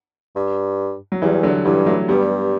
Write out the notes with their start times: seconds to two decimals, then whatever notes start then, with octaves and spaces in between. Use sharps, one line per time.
0.36 G2
1.12 F#3
1.22 E2 E3 G3
1.43 D3 F#3
1.65 G2 E3 G3
1.86 F#3 A3
2.08 G2 G3 B3